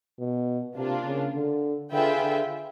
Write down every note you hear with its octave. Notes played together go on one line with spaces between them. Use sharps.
B2
C3 A#3 D4 F4
C#3
D3
D3 F4 G#4 B4 E5 G5
D3